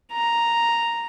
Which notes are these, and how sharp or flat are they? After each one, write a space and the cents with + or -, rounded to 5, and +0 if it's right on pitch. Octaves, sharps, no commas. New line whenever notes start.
A#5 +0